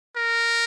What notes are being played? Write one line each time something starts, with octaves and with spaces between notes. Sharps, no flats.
A#4